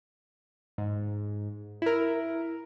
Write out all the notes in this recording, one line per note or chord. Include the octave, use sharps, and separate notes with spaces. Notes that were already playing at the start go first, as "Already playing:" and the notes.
G#2
E4 A#4